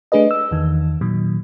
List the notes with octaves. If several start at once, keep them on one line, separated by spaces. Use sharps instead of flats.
A3 D4 G#4 B4 D#5
E6
E2 D#3
A#2 D#3 F#3